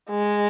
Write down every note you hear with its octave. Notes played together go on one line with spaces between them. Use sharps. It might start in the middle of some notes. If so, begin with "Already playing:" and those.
G#3